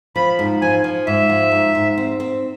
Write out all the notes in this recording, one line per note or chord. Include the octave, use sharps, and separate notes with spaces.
F3 B5
G#2
F3 G#5
F3
G#2 E5
F3
G#2
G#2
C4
C4